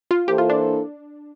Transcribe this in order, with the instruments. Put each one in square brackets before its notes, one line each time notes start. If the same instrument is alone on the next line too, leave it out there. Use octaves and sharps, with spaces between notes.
[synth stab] F4
[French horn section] E3 A#3 E4 A4 C5 [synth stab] G4
[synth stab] F4
D4